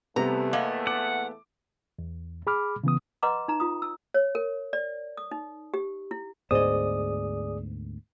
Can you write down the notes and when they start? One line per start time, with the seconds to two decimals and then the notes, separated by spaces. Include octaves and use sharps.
0.16 E2 C3 G3 A3 B3 A#5
0.53 A#3 B3 D#5
0.87 F#5 D6
1.99 E2
2.47 G#4 B5 D6 F6
2.84 C#3 E3 B3 D#6
3.23 B4 D#5 F#5 A#5 C6 D6
3.48 D#4 A#5
3.60 F4 D#6
3.82 E6
4.14 C#5
4.35 A#4
4.73 D5
5.17 D#6
5.31 D#4
5.74 G4
6.11 E4
6.51 D2 G#2 B3 G#4 C5 D5 D#5 D#6